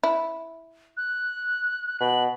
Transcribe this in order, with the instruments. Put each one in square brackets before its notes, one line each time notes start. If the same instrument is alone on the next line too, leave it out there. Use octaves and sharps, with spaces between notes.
[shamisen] E4
[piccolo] F#6
[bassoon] B2 [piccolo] F#7